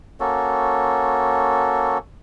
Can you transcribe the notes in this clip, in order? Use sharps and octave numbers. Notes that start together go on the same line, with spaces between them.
A#3 C#4 F#4 A4